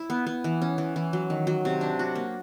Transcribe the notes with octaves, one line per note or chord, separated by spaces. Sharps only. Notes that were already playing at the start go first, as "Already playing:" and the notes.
Already playing: E4
B3
B3
E3
C#4
E3
E3
F#3
D#3
F#3
C3
D4
F#4
A#3